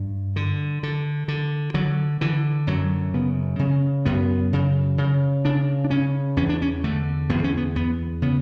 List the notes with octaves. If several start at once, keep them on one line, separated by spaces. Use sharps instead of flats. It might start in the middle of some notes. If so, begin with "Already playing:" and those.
Already playing: G2
D3
D3
D3
D3 F#3
D3 E3
F#2 F#3
C#3 B3
C#3 C#4
F#2 B3
C#3
C#3
C#3 D4
D4
C#3 C#4
E2 C#4
D4
C#4
D3 A3
E2 B3
C#4
B3
E2 B3
C#3 B3